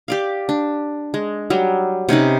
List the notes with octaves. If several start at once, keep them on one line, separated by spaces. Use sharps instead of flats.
G4 D5 F5
D4
G#3
F#3 G3
C3 C#4 D#4 B4